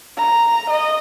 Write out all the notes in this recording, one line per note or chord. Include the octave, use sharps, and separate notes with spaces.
A#5
D#5